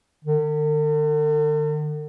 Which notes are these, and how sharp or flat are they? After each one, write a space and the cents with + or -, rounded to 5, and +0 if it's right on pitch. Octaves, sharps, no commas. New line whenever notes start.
D3 +45